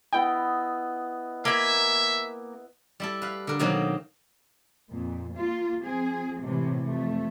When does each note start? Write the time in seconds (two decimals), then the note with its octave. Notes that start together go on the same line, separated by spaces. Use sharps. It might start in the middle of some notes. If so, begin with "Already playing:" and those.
0.13 B3 E4 D#5 G5
1.45 A#3 E5 G#5
3.00 G3 E4 A4
3.22 B4 F5
3.47 D3 A#4
3.59 B2 D#3 F#3 A#3 C4 D#4
4.91 F2 A#2
5.35 A#3 F4
5.84 F3 C4 G#4
6.39 A2 C3 E3 G#3
6.87 F2 A3